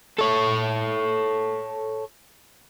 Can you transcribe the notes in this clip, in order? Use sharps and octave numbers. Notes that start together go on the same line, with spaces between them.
A4 C#5